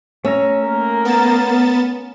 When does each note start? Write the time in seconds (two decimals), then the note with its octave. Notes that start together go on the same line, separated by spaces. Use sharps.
0.25 A3 C#4 E5 A#5
0.65 A#3 A#4
1.05 B3 A6 E7